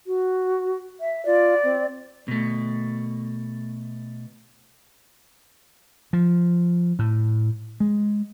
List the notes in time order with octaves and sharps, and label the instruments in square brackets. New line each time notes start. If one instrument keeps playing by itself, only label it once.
[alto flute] F#4
E5
[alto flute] F4 [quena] D5
[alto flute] C4
[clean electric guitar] B2 A3
[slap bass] F3
A2
G#3